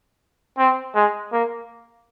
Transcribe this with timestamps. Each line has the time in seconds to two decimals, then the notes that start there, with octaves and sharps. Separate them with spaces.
0.58 C4
0.95 G#3
1.33 A#3